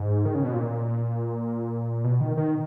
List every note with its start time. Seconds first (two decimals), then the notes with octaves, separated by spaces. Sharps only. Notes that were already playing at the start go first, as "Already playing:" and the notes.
Already playing: G#2
0.25 D#3
0.35 C#3
0.44 B2
0.53 A#2
2.04 B2
2.21 D#3
2.37 D#3